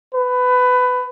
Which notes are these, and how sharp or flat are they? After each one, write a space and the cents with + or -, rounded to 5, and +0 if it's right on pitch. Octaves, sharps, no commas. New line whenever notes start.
B4 +20